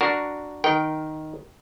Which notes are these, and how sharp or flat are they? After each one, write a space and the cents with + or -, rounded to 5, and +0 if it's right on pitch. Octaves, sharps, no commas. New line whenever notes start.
D4 +5 F#4 +0 A#4 +0
D#3 +0 A#4 +10 G5 -20